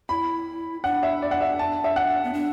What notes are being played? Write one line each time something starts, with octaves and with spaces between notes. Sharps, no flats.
E4 B5
D4 F#5
E5
D5
F#5
E5
A5
E5
F#5
B3
D4